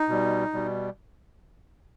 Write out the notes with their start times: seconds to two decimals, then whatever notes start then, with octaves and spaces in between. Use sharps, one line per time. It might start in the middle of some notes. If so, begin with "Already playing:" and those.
Already playing: D#4
0.09 B2 G3
0.53 B2 G3